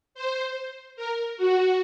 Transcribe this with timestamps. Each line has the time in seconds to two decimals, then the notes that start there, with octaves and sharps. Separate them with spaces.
0.15 C5
0.96 A#4
1.37 F#4